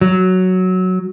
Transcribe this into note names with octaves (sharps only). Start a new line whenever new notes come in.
F#3